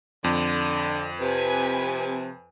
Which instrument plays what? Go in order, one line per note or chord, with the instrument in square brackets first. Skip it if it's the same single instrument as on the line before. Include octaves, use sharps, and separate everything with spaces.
[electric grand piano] F2 [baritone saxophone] D3
[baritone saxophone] C3 [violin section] B4 G#5